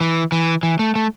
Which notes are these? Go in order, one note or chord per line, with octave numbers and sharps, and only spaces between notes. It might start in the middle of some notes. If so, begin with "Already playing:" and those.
E3
E3
E3
A3
A3